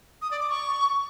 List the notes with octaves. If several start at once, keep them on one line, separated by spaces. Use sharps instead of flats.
D#6
D5
D6
C#6